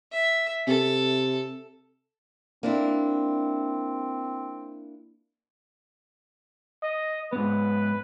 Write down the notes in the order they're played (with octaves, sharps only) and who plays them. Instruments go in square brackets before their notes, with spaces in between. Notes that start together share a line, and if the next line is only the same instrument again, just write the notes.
[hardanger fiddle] E5
[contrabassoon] C3 [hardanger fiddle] A4
[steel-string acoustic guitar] A#3 D4 E4 [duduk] C4
[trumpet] D#5
[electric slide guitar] G#2 B3 [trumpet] B4